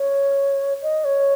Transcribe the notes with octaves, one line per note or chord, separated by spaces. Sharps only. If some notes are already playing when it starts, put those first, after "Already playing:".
Already playing: C#5
D#5
C#5